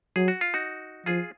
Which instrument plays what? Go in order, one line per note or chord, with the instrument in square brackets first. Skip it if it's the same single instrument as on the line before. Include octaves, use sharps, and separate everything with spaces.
[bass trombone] F#3 [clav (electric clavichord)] G#4
[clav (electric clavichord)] F#4
F4
D#4 F#4
[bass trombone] F3 [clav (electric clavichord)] F4 G#4